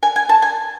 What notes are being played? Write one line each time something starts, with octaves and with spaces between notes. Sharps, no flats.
G#5
G#5
A5
G#5